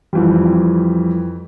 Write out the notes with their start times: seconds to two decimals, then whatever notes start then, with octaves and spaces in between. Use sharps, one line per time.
0.13 F2 E3 F3 G3